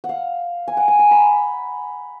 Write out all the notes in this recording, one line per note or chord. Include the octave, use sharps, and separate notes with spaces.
F#5
F5
G#5
F#5
G#5
A#5
B5